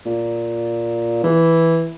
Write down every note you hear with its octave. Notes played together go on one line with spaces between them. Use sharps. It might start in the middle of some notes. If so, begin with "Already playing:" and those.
A#2
E3